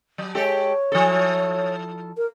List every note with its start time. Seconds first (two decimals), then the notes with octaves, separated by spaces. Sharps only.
0.18 F#3
0.35 G#3 G4 A4 C#5
0.92 F3 E4 A4
2.17 A#4